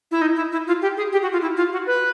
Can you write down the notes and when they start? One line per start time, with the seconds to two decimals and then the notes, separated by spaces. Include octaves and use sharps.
0.11 E4
0.22 D#4
0.36 E4
0.52 E4
0.67 F4
0.82 G4
0.97 G#4
1.12 G4
1.22 F#4
1.32 F4
1.41 E4
1.57 F4
1.73 F#4
1.87 B4